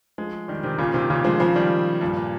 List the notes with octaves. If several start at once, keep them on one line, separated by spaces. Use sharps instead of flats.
F3 G#3
D#3 G3
C3 D#3
A#2 C#3
C3 D#3
A#2 C#3
F3 G#3
C#3 F3
D#3 G3
G2 A#2
A#2